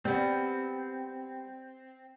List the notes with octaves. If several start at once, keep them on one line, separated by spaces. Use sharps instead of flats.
G3 B3 C4